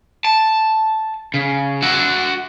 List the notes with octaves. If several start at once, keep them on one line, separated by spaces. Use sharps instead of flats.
A5
C#3
F#4 E5